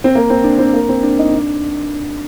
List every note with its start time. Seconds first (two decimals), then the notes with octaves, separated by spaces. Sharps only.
0.04 C4
0.15 A#3
0.30 C4
0.44 D4
0.59 C4
0.73 A#3
0.89 C4
1.03 D4
1.19 D#4
1.33 D4